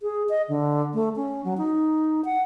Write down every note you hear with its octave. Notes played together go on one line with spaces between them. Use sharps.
G#4
D#5
D3
A3
C#4
F#3
D#4
F#5